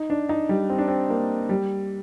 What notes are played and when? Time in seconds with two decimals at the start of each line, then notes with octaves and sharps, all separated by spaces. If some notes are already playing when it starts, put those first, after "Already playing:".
Already playing: D#4
0.10 D4
0.29 D#4
0.49 G3
0.70 C4
0.79 D4
0.88 C4
1.10 A#3
1.49 G3